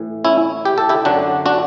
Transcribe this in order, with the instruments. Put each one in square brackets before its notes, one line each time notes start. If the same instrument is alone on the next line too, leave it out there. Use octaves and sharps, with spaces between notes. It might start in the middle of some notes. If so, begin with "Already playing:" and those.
Already playing: [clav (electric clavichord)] A2 E3
C#4 E4
G4
A4
E4 G4
F#2 D3 F#3 D4 F#4
D4 F#4